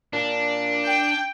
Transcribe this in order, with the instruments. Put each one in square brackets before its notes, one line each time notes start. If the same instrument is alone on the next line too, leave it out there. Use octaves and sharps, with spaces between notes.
[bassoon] A#2 [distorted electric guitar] D4
[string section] G5